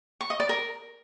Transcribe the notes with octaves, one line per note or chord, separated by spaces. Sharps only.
C#6
D#5
D5
A#4